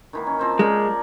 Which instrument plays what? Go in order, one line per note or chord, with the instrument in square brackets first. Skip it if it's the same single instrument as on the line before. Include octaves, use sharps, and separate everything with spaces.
[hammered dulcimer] D#3 E3 A#3
C#4
F3 C4 C5
[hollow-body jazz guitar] G#3 [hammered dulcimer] C#4 A#4 D5